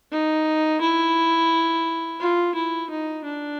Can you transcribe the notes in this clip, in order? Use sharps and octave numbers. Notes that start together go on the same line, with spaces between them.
D#4
E4
F4
E4
D#4
D4